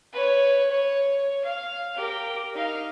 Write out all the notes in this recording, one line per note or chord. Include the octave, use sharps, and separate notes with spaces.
B4 C#5
C#5
F5
G4 A#4
D#4 F5